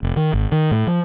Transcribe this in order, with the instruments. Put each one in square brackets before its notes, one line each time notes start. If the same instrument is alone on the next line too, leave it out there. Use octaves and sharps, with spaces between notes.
[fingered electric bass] F1
D#3
G#1
D#3
A2
F3